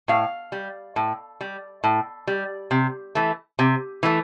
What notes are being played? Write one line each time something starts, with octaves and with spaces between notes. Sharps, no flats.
A2 F5
G3
A2
G3
A2
G3
C3
E3 A3
C3
E3 A3